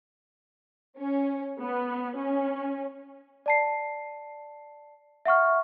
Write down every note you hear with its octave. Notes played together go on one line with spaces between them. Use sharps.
C#4
B3
C#4
D5 A5 C7
E5 F#5 C#6 F6